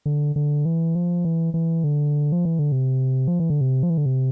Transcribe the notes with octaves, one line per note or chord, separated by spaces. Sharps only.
D3
D3
E3
F3
E3
E3
D3
F3
E3
D3
C3
F3
E3
D3
C3
F3
E3
D3
C3